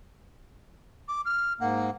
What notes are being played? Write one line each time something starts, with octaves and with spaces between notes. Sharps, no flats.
D6
F6
G#2 A#3 F#5